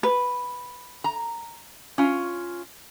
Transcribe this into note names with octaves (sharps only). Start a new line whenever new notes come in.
B4
A#5
C#4 F4